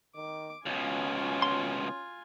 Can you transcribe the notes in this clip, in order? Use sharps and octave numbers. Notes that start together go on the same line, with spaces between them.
D#3 D6
C#2 B2 C#4 F4 G#5
C6